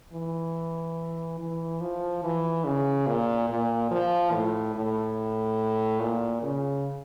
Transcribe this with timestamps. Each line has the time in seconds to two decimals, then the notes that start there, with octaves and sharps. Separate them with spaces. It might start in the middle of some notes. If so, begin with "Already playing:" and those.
0.13 E3
1.40 E3
1.81 F3
2.24 E3
2.65 C#3
3.07 A#2
3.50 A#2
3.91 F3
4.33 A2
4.76 A2
6.00 A#2
6.42 C#3